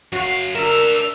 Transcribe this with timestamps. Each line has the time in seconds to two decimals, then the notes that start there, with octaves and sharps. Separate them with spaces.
0.12 F#2 F#4 F5
0.55 D4 A#4 E5 E6 F6